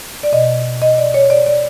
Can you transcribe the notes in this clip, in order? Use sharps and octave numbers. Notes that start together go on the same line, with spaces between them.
D5
B2 D#5
D#5
D5
C#5
D5
D5